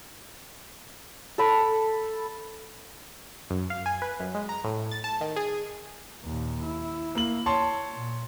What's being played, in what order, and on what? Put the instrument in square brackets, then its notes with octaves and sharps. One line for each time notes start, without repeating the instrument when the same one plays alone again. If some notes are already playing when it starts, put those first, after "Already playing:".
[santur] A4 A5 B5
[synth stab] F#2
F5
G#5
B4
F#2
G#3
A#5
A2
A6
A5
D#3
G#4
[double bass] D#2 A#2
E4
[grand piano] A#3 F#7
C#5 A5 C6
[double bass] A#2